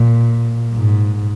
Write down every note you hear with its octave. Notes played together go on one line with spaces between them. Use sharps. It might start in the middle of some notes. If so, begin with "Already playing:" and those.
Already playing: A#2
G#2